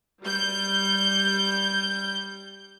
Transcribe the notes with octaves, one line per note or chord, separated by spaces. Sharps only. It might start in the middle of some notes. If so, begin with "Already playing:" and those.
G3 G6